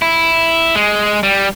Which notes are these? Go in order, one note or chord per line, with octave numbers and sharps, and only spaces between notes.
E4
G#3
G3